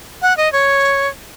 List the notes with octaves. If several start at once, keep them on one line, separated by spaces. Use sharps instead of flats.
F#5
D#5
C#5